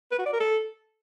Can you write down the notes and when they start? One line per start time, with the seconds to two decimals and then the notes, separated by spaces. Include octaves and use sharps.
0.12 B4
0.19 F#4
0.26 D5
0.33 A#4
0.40 A4